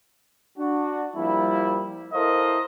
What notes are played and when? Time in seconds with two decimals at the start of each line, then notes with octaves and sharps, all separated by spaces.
0.58 D4 F#4
1.15 F3 G3 A#3 E4
2.13 E4 A4 A#4 C5 D#5 F5